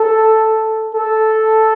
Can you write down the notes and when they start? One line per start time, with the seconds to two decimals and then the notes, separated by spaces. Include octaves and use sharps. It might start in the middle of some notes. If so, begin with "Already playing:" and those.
Already playing: A4
0.95 A4